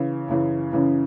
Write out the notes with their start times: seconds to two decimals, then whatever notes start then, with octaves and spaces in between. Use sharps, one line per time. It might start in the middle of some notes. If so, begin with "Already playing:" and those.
Already playing: C#3 E3
0.28 F#2 C#3 E3
0.73 F#2 C#3 E3